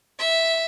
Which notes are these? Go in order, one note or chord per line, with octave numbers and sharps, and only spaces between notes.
E5